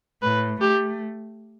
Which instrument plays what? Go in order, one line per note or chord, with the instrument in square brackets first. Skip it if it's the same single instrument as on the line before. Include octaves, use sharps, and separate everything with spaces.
[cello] A2 [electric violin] B4
[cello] A3 [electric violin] G4